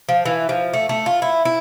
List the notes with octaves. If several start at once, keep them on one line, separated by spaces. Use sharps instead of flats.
F3
E3
F3
A3
A3
F4
E4
E4